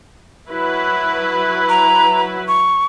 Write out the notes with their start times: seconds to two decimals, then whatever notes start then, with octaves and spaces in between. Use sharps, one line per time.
0.49 F#3 E4 B4
1.69 A#5
2.48 C#6